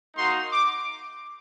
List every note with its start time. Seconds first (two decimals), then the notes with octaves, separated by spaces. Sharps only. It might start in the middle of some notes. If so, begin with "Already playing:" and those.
0.16 A#3 D#4 F#4 C6
0.52 D6